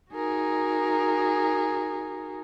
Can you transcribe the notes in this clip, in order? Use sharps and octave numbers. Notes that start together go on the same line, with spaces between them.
D#4 F#4 G#4 A#4